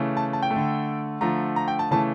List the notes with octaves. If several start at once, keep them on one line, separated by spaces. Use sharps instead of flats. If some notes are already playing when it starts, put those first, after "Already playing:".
Already playing: C#3 E3 A3
A5
A5
G5
A3
D3
D3 F3 A3 A#5
A#5
G5
A5
C#3 E3 A3 A5